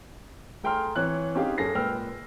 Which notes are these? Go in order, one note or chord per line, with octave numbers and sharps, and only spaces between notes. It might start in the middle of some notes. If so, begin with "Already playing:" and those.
A3 G#4 G5 A#5 C6 F6
E3 C4 C#5 F#6
C4 C#4 D#4 G4 G#4 F5
F#2 G#4 A4 A#6 C7
A#2 G#3 B4 G5 E6 F6